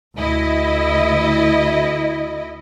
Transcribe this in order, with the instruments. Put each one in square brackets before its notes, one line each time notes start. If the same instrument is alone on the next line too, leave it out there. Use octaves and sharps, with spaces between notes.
[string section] D2 E4 D#5